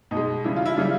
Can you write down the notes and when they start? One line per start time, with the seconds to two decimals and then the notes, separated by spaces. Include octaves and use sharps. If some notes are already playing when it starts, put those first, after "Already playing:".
0.11 B2 D#4
0.16 G#3
0.44 C#3 E3 G3 E4
0.56 F4
0.66 E4
0.76 C#3 E3 G3 F4